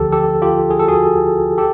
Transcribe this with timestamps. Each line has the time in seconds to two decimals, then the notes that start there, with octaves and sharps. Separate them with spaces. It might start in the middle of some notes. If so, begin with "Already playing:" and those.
Already playing: D2 D3 F3 G4 A4
0.12 G4 A4
0.42 F4 G4
0.71 G#4
0.79 A4
0.88 F#4 G#4
1.58 G4 A4